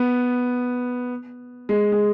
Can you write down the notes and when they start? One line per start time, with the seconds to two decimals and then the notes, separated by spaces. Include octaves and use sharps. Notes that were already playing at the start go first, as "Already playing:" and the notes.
Already playing: B3
1.69 G#3
1.92 G#3